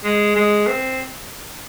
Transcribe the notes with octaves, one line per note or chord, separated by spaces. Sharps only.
G#3
G#3
C4